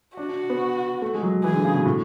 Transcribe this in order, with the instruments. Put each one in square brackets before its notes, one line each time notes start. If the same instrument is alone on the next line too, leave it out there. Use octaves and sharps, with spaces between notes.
[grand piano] D4 [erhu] F#4
[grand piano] D4
B3
A3
G#3
F#3
[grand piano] E3 [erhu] G#4
[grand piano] D3
C#3
B2
A2